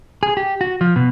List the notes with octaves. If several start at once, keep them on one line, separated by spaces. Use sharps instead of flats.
G#4
G4
F#4
F3
B2